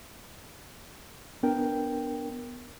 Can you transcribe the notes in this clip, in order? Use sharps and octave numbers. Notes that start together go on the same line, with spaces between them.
B3 D4 A#4 G5